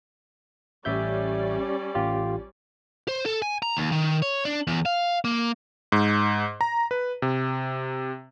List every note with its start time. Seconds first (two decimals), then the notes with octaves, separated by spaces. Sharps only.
0.85 A1 G3 C#4 D5 E5 G6
1.95 A1 F4 G4
3.08 C5
3.26 A4
3.42 G#5
3.62 A#5
3.77 D#2
3.92 D#3
4.22 C#5
4.45 D4
4.67 E2
4.86 F5
5.25 A#3
5.92 G#2
6.61 A#5
6.91 B4
7.22 C3